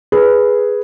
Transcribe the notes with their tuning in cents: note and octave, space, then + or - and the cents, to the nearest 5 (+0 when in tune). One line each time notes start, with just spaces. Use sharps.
G#4 +0 B4 +0